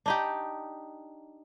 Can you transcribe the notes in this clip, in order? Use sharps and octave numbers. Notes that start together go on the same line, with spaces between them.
D4 D#4 G4